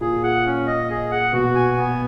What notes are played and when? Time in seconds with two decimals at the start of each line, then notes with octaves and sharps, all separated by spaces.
0.01 A#2 G#4
0.23 F#5
0.46 C#4
0.67 D#5
0.90 G#4
1.11 F#5
1.33 B2 F#4
1.55 G#5
1.77 B3